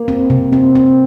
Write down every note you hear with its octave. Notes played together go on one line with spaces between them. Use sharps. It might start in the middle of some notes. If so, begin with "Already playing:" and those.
Already playing: A#3
C4
C3
C4
C4